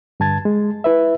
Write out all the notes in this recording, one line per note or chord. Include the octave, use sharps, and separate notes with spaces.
G2 D3 A5 G#6 A6
G#3
E4 B4 E5